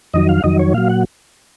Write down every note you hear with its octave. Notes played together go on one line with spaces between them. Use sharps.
F2 D#3 F#3 D#5
F5
F2 D#3 F#3 D#5
C#5
A#2 F#3 F5
F#5